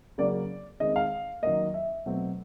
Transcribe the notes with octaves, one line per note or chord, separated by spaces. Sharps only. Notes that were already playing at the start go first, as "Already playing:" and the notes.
C#3 F#3 A#3 D5
D#3 G#3 C4 D#5
F5
D#3 F#3 A#3 D#5
E5
B2 F#3 A3 C4